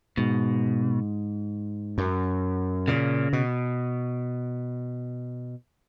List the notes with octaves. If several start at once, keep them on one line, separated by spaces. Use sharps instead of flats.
G#2 B2
F#2
A#2 C#3
B2